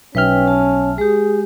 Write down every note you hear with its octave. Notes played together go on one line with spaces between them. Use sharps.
B1 C#4 B4 E5 G5 F6
A5
G#3 G4 G#4